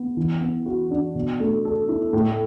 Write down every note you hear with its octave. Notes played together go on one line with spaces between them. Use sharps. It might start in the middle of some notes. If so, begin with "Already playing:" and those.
Already playing: B3
E3
B3
F#4
D4
B2
A3
A4
E4
A2